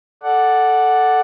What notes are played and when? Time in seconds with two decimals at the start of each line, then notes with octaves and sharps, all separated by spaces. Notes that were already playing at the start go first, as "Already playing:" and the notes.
0.23 A4 D5 F#5